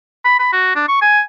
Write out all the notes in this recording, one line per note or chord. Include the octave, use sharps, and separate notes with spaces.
B5
B5
F#4
D4
C#6
G#5